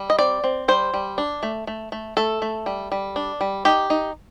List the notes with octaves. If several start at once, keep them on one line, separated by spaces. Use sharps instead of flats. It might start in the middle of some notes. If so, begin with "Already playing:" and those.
Already playing: G3
D#5
C4 D5
C4
G3 C5
G3
D4
A3
A3
A3
A3 A4
A3
G3
G3
D4
G3
D#4 G4
D#4